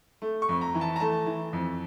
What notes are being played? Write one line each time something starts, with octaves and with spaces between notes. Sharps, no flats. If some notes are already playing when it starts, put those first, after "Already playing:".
A3
C#6
F2
A#5
E3
A5
A#5
A3 A5
E3
F2